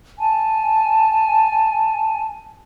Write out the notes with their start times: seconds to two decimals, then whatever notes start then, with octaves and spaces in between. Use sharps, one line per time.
0.17 G#5 A5